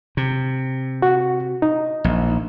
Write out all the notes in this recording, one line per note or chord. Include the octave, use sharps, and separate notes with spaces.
C3
F#4
D#4
A#1